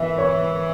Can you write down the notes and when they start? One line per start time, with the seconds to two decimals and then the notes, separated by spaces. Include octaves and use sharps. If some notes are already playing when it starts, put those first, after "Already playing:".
Already playing: E3 E5
0.18 C#5